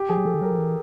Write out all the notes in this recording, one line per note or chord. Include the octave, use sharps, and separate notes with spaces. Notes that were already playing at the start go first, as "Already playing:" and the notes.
Already playing: G4
F3 G#4
F#3
F3 A4
D#3
F#3 A#4
F3
E3